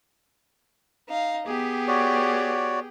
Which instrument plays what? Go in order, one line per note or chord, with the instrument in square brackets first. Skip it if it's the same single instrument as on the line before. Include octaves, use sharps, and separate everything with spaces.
[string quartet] D#4 F5
[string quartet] B3 G4 [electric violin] G#4 G5
[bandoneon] F#4 C#5 D5